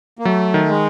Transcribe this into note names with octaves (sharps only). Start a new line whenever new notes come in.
A#3
F#3 A3
D#3
G#3